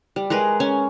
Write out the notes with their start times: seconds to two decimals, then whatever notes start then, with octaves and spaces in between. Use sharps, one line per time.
0.16 G3
0.30 G#3 G#4 A#4 B4
0.60 C#4 G#5